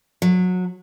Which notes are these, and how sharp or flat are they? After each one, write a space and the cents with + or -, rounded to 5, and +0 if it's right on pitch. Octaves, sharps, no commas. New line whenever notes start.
F#3 -25